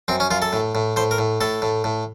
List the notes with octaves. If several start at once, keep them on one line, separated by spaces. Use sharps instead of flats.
F#2 C4
C#4
F#2 F4
A4
A2
A2
A2 C5
A#4
A2
A2 A4
A2
A2